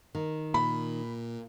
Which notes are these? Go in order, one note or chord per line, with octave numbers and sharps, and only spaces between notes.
D#3
A#2 B5